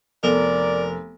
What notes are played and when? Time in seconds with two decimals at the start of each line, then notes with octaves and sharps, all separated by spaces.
0.24 F1 B3 A4 A#4 D5